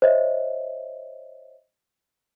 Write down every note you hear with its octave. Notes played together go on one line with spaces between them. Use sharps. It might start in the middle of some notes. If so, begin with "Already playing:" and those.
C5 C#5 D#5 E5